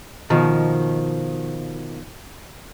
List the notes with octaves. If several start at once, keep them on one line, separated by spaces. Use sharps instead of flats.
B2 D#3 F3